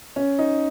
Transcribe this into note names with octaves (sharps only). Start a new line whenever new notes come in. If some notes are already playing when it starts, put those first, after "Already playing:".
C#4
D#4